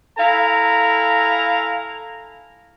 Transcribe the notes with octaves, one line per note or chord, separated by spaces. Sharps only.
E4 A4 F5 G#5 A#5